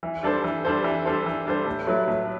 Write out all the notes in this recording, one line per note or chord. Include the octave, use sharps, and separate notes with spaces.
E3
G3 D4 A4 C5
E3
G3 D4 A4 C5
E3
G3 D4 A4 C5
E3
G3 D4 A4 C5
A2
F#3 A3 E4 B4
A2